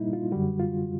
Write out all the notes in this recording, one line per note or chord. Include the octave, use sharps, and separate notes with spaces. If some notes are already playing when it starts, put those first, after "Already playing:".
Already playing: A#2 G3 A#3 D#4 E4
F4
F#2 D3 G3 F#4
F4